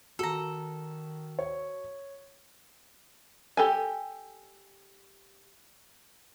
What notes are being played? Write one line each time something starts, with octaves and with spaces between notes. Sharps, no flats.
D#3 F#4 A4 A#5
C#5
G4 A4 G#5